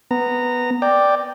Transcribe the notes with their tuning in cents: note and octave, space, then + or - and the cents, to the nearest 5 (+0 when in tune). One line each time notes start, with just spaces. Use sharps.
B3 +0 A#5 -15
D5 +0 G5 +0